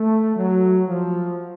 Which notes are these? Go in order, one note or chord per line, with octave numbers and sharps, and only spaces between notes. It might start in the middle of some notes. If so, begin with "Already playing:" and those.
Already playing: A3
F#3
F3